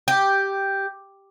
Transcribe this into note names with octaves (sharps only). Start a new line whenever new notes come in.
G4